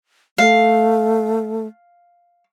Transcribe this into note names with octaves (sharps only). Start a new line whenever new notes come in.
A3 F5